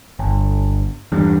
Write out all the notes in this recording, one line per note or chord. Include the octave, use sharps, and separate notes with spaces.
G1
E2 G2